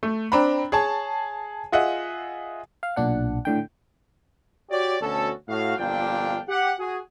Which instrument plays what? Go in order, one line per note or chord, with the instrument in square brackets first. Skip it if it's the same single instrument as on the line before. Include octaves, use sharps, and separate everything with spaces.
[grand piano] A3
C4 D4 G5 A#5 B5
G#4 C#5 A5
F4 G#4 D#5 E5 F#5
[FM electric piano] F5
B1 A#2 D4 F#5
A2 D3 G5
[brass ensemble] F#4 G4 C#5 D5
D2 B2 C#4 F#4 A4
A2 F#4 F5
G1 F2 A#2 D4 F5 G5
G4 F#5
F#4 G#4